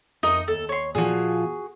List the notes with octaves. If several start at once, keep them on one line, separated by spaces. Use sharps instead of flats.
F2 D#4 A#4 D#5
D#2 A4
C#5 C6
A#2 F3 F#4 G#4